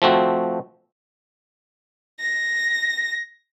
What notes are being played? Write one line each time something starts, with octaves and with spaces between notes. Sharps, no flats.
F3 A3 C4 F#4
A#6